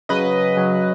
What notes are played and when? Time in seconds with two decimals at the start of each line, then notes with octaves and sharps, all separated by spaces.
0.09 C#3 F#3 B4 D#5
0.56 C#3 F#3